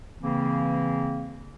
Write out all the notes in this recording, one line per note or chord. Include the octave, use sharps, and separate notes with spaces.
C#3 E3 A#3 C4